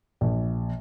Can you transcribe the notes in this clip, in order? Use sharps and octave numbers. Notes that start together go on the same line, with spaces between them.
A#1